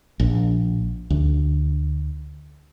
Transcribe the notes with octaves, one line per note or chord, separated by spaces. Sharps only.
A#1
D2